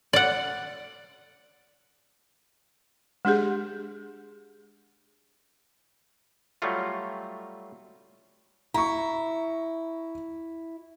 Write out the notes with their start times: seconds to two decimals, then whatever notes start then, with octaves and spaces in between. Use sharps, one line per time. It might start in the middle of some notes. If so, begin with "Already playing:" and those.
0.13 D5 F#5
3.25 G#3 D4 G4 G#4
6.62 F#3 G3 A3 F4
8.74 E4 A#5 C#6